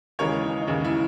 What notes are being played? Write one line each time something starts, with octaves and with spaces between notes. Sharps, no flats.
D#2 C#3 E3 G#3 A#4 C#5
D#4
D#4
D#2 C#3 E3 G#3 E4
E4